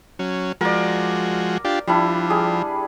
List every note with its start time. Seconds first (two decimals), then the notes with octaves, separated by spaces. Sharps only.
0.19 F#3 C#4
0.61 F3 G#3 F#4 A#4 D5
1.65 D4 F4 G4
1.87 F3 G3 D4 E4
2.30 G3 G#4